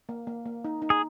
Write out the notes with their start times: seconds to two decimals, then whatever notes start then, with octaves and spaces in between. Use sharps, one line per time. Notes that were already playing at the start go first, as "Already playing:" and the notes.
0.09 A#3
0.27 A#3
0.46 A#3
0.65 D#4
0.82 D#4
0.90 G#4